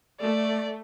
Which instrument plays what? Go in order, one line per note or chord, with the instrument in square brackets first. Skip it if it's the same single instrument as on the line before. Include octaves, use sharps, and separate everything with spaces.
[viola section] A3 [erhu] D5